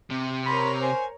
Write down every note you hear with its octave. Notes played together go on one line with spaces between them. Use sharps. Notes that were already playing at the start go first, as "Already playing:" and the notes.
C3
A#4 C#5 B5 C6
C5 G#5